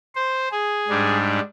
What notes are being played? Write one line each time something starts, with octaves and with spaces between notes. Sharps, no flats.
C5
G#4
G#2 G3 D4